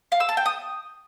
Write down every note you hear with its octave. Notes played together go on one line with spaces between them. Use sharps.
F5
E6
A5
G5
D#6